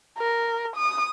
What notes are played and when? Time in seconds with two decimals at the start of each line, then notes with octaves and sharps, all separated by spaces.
0.18 A#4
0.76 D#6